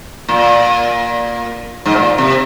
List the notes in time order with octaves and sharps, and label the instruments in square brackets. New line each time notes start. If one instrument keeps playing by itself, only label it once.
[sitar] A#2
G#2
A#2
C3